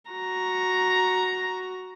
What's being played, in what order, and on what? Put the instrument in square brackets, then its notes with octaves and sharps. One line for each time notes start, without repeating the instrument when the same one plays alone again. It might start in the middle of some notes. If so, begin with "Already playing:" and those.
[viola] F#4 A#5